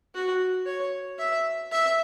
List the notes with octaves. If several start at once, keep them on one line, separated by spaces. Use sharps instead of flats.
F#4
C#5
E5
E5